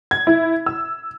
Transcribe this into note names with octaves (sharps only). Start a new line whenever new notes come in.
G#6
E4
E6